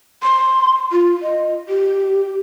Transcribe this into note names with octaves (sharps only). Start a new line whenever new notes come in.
C6
F4
D#5
G4